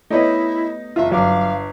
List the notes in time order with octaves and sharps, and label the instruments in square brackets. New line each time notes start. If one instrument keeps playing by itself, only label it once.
[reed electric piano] A3 B3 [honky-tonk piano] D#4 [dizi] E4 [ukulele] G4 C#5 D#5
[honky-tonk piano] F#1 F4 [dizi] E5
[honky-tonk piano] G1 [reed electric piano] F#3 D6 [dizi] F5